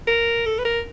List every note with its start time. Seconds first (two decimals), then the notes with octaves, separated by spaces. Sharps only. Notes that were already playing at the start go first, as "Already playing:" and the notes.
0.07 A#4
0.46 A4
0.58 B4
0.65 A#4